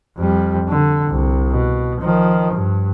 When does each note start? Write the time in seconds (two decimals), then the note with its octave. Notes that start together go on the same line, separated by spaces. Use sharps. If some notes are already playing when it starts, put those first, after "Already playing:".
0.18 F2 G3
0.68 D3
1.08 C2
1.51 B2
2.00 D#3 F3
2.53 G2